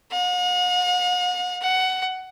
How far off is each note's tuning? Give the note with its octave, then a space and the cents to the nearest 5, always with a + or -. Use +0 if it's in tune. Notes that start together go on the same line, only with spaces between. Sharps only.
F#5 -45
F#5 +15